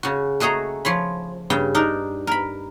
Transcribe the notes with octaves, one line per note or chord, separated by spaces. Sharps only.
C#3 F#4
A3 F#4 G#4 D#5 A#5
F3 C#5 B5
G2 C#3 G5
D4 D#4 A#4
A#4 B5